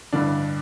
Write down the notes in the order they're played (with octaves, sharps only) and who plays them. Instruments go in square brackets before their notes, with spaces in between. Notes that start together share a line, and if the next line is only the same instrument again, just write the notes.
[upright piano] A1 G2 D3 D4